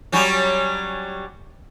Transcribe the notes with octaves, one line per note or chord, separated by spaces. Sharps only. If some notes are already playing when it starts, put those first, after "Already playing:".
F#3 G3 C#4